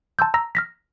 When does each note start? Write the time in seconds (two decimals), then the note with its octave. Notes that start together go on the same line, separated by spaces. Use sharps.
0.19 A5 C6 E6 G6
0.34 A#5 E6 A#6
0.55 F6 A#6 B6